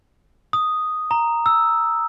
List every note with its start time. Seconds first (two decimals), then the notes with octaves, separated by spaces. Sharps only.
0.53 D#6
1.11 A#5
1.46 E6